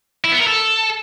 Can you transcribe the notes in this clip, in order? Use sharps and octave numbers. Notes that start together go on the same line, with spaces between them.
E4
B3
A#4
A4